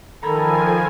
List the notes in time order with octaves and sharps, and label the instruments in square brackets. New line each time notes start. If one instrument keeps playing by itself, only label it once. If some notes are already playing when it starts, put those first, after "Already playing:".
[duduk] D#3 [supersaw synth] F3 G#5 [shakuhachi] A4 [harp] A#5 B5 G#6